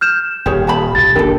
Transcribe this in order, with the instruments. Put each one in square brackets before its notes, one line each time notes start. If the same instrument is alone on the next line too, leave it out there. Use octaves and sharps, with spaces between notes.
[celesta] F6 G6 E7
[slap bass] D#1 [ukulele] G4 G#4 C#5
[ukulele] G4 A5 B5
[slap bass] B1 G2 [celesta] A6
[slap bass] F1 D#2 D4 [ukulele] G4 A4 [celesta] A#4